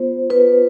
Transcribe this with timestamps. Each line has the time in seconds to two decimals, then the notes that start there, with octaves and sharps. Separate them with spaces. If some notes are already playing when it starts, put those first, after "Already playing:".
Already playing: B3 F4 C5
0.30 F4 B4